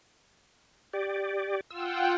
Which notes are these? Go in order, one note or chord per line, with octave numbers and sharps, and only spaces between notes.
G4 D5
F4 F#5 G5 E6